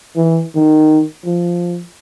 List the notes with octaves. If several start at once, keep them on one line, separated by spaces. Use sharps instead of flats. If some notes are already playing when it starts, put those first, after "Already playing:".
E3
D#3
F3